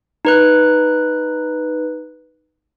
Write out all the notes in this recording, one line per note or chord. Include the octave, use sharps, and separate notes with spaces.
D#4 B4 F#6